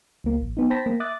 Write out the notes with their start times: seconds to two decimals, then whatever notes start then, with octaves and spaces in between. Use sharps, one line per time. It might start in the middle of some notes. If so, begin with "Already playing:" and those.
0.24 C#2 A#3
0.41 A1
0.57 B3 D#4
0.70 C5 G5 A5 B5 A#6 B6
0.86 A#3
1.00 E5 D6 D#6 F#6 A6